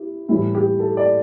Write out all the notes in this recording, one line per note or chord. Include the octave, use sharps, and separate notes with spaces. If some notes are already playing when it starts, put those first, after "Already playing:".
Already playing: E4 G4
A2 E3 G3 E4
G4
A4
D5